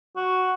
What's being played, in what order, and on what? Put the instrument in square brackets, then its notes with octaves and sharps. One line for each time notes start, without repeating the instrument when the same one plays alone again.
[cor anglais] F#4